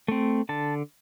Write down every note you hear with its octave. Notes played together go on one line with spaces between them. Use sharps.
A3 C4
D3 A5